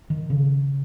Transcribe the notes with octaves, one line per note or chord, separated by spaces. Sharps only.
D#3
C#3